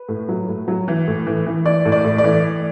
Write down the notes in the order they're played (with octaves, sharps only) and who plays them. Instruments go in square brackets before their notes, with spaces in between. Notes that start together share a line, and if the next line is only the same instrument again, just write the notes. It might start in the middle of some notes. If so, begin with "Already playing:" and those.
Already playing: [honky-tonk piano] B4
A2
F#3
A2
F#3
E3
A2
E3
E3
E3 D5
A2
D5
A2
D5
E3